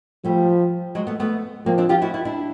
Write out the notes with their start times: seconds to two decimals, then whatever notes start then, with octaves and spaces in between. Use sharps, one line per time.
0.24 F3 G3 A3
0.95 F#3 G#3
1.07 A3 B3
1.20 A3 B3
1.66 F3 A#3 C4
1.78 C4 D4
1.89 F4 G4
2.02 E4 F#4
2.14 E4 F#4
2.25 D4 E4